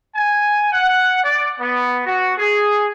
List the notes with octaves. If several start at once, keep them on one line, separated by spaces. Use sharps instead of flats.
G#5
F#5
D5
B3
F#4
G#4